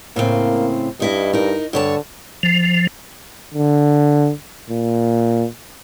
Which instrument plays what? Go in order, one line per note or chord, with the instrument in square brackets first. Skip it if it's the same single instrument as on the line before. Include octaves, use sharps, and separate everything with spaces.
[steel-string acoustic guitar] A2 C#3 C4 [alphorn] A#3
[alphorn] G2 [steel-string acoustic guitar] D#4 E4 D#5
[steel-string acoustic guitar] D#4 A#4
[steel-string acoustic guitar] G2 C#5 A5 [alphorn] D3
[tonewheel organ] F3
[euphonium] D3
A#2